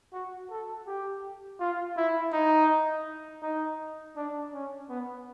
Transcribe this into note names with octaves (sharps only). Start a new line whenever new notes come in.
F#4
A4
G4
F4
E4
D#4
D#4
D4
C#4
B3